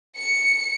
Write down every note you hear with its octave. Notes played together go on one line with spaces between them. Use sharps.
C#7